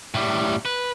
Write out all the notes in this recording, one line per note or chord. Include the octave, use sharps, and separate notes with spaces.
A2 G3
B4